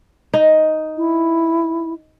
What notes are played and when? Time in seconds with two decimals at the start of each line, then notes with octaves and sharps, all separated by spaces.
0.34 D#4
0.97 E4